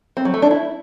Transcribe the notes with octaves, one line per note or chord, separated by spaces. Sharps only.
C4
F#3
A3
D4
E4